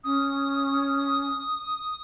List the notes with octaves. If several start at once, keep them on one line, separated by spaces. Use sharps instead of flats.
C#4 D#6